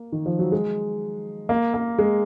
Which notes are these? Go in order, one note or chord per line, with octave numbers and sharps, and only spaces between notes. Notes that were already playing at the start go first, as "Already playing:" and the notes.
Already playing: A#3
D#3
F3
F#3
G#3
A#3
A#3
G#3